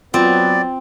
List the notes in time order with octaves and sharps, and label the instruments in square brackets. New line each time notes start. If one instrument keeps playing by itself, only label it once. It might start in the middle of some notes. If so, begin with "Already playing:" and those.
[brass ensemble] F#3 B3 [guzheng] C4 [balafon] F4 [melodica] D5